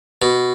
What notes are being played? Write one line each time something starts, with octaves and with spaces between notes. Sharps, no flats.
B2